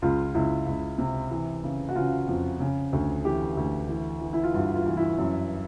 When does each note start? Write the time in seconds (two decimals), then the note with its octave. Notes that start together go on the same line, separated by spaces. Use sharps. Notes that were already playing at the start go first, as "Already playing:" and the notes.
0.02 C#2 F4
0.34 C#2 E4
0.67 C#2
0.98 C3
1.31 E3
1.64 C#3
1.89 F#4
1.96 C#3 F4
2.28 F2
2.60 C#3
2.93 D2
3.25 E3 G4
3.57 D2
3.89 E3
4.21 E3
4.33 E4
4.43 F4
4.54 G2 F#4
4.75 F4
4.86 E3
4.97 E4
5.18 F#2